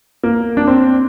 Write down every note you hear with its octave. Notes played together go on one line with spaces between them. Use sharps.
A#3
D4
C4